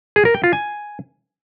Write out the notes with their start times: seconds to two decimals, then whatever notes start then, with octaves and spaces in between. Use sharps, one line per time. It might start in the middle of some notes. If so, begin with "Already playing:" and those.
0.16 G#4
0.25 A#4
0.34 G5
0.44 F4
0.53 G#5